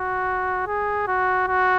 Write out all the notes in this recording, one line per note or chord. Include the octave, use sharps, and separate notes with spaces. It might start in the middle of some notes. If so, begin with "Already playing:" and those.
Already playing: F#4
G#4
F#4
F#4